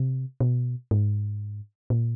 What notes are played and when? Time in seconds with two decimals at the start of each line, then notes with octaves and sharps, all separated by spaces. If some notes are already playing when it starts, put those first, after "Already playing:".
Already playing: C3
0.40 B2
0.91 G#2
1.90 A#2